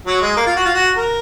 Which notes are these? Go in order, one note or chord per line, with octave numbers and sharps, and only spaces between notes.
F#3
G#3
A#3
F4
F#4
F4
F#4
A#4